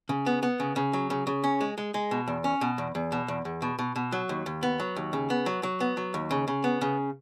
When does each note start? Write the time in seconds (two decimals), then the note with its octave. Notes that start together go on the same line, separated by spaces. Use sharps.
0.09 C#3
0.26 B3
0.43 B3
0.60 C#3
0.76 C#3
0.93 F#3
1.10 C#3
1.27 C#3
1.44 C#4
1.61 G#3
1.78 G#3
1.94 G#3
2.11 B2
2.28 E2
2.44 C#4
2.61 B2
2.78 E2
2.95 E2
3.12 B2
3.28 E2
3.45 E2
3.62 B2
3.79 B2
3.96 B2
4.12 F#3
4.29 D#2
4.46 D#2
4.63 B3
4.80 F#3
4.96 D#2
5.13 C#3
5.30 B3
5.46 F#3
5.63 F#3
5.80 B3
5.97 F#3
6.14 D#2
6.31 C#3
6.48 C#3
6.64 B3
6.81 C#3